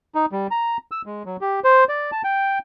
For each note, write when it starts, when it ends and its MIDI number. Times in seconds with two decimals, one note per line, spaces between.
0.15 0.26 63
0.32 0.47 55
0.51 0.77 82
0.91 1.02 88
1.06 1.23 56
1.26 1.37 54
1.41 1.60 67
1.64 1.84 72
1.89 2.11 74
2.12 2.22 81
2.24 2.59 79